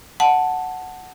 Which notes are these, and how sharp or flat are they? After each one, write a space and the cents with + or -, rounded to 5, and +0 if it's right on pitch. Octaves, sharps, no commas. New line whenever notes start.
F#5 +0 A5 +0